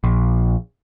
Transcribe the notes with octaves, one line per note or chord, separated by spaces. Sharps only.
A#1